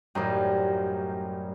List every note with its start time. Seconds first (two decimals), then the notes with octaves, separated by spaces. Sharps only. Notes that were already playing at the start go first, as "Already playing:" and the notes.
0.15 A1 F#2 G3 D#4 C5